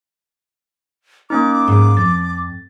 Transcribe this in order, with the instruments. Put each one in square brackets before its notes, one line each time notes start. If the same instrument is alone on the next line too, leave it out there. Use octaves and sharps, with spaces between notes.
[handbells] A#3 C#4 D#4 [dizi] D6
[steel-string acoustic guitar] G#2 G#3
[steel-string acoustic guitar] F2 [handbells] A6